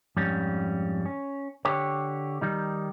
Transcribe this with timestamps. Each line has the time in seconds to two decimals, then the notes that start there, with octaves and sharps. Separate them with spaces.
0.17 F2 G#2 G3 C#4
1.06 C#4
1.65 D3 G4 C#5
2.41 D#3 G3 D#4